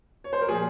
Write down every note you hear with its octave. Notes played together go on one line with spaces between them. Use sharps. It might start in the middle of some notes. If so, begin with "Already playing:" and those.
C#5
C5
A#4
A#2 F3 G#4